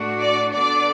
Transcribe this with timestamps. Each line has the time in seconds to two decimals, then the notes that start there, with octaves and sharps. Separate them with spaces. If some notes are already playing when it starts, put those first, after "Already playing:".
Already playing: A2 A3 D4 F#4
0.21 D5
0.53 D3 B3 D4 D5